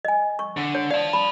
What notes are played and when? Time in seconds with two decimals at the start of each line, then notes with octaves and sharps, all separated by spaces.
0.05 D#5 G#5
0.39 C#6
0.57 D3
0.75 C#5
0.91 D5 F5 A5
1.13 B5